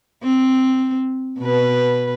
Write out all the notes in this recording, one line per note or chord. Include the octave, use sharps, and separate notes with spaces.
C4
B2 B4